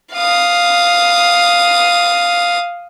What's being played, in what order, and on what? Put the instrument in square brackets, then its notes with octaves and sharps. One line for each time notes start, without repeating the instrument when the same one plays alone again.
[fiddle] F5 D#6